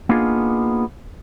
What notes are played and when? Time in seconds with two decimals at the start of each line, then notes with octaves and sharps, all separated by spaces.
0.09 A#3 B3 D4 D#4 F4 G#4